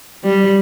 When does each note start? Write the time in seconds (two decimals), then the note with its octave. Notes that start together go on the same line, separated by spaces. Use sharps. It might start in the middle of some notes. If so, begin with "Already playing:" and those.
0.24 G3